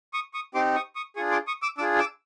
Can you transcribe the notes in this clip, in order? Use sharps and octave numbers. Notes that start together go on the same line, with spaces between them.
C#6 D#6
C#6 D#6
C4 D#4 G4 C6 D6
C#6 D#6
C#6 D#6
D4 F4 G#4 C#6 D#6
C6 D6
C#6 D#6
D6 E6
D4 F4 G#4 D6 E6
D6 E6